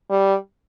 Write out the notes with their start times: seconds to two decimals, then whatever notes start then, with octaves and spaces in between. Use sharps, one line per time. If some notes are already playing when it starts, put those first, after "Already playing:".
0.10 G3